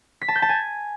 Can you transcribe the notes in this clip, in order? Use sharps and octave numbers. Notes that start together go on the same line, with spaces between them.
B6
A5
G6
A5
G#5